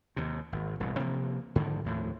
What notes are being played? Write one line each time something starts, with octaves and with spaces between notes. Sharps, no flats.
D#2 C3
G#1
E1 C2 A2
C3 F3 A#3
G#2 D3 D#3 F3
D#2 A2 F3